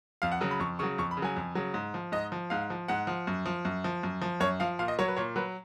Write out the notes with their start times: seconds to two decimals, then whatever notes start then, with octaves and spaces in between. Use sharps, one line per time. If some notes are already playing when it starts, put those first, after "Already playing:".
0.22 F2 F5
0.32 F#5
0.41 C#3 F#3
0.51 B5
0.60 F2 C#6
0.79 C#3 F#3 C#6
0.98 F2 C#6
1.11 B5
1.17 C#3
1.22 F#3 G#5
1.37 F2
1.55 C#3 F#3
1.74 G#2
1.94 F3
2.12 G#2 D#5
2.32 F3
2.50 G#2 F5
2.70 F3
2.88 G#2 F#5
3.07 F3
3.27 F#2
3.46 F3
3.65 F#2
3.84 F3
4.03 F#2
4.22 F3
4.40 F#2 C#5
4.60 F3 F5
4.79 A#2 F5
4.88 D#5
4.99 F#3 C#5
5.08 B4
5.16 A#2 C#5
5.36 F#3 B4